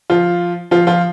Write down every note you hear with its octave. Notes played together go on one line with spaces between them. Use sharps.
F3 F4
F3 F4
F3 F4